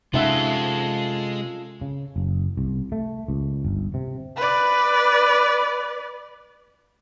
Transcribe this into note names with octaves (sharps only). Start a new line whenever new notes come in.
C3 G#3 C#4 D#4 F4 A4 E5 F#5
C#3
F#1
C2
A3
C#2
G1
C3
B4 D5